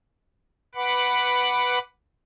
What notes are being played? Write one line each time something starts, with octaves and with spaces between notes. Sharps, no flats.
B4 F#5 B5 D6